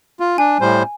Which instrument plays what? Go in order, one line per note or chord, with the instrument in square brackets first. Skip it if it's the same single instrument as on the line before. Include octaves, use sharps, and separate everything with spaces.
[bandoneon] F4
[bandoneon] D4 [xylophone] G#5
[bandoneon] A2 G3 C5